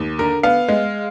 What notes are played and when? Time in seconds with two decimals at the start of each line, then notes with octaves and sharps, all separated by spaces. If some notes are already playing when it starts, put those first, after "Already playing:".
Already playing: D#2
0.19 D3 A#4
0.43 B3 F5
0.68 G#3